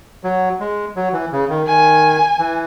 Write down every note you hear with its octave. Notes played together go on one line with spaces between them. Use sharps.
F#3
G#3
F#3
E3
C#3
D#3
D#3 G#5
E3